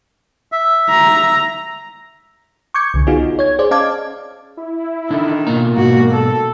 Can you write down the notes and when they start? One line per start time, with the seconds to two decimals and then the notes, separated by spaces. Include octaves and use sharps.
0.52 E5
0.91 A#5
2.74 C#6 D6 G6 G#6 C#7
2.94 C2 D3
3.07 B3 D#4 F4 F#4 G#4
3.39 C#5 G#6
3.59 G#4 C5 D5
3.71 C#4 D#5 F5 A5 D6 G#6
4.57 E4
5.11 D#3 D4 D#4 A4
5.47 B2 A#3 F4 A#5
5.77 G#2 B2 F#4
6.11 A4